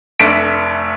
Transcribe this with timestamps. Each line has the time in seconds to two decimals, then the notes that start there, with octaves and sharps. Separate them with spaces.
0.20 F1 A3 D4 E5 B6 D7